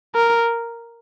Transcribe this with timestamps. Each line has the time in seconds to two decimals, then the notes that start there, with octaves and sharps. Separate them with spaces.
0.15 A#4